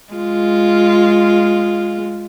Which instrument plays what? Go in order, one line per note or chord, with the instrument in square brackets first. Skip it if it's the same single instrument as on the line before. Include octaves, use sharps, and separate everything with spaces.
[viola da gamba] G#3 F4